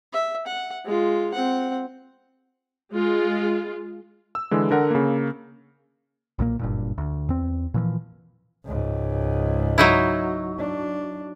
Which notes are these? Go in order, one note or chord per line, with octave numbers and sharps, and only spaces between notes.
E5
F#5
G#3 F4
C4 F#5
G#3 F4
E6
D3 E3 G#3
D3 A#4 F#5
C#3 A#3
B1 A#2 E3 A#3
F#1 G2 A#2
D2
E2 C4
A#2 E3 F3
C#2 G#2
F#3 D#4 E4
D4